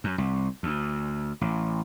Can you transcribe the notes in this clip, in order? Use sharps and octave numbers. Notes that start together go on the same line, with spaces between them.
F#2
C2
D2
A1